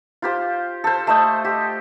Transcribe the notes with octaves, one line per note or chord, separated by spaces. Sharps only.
F4 G4 C5
A4 C5
A3 C5 D#5
G4